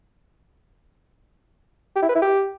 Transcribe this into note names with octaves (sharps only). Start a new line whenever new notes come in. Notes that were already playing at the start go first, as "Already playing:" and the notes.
G4
E4
B4
E4
G4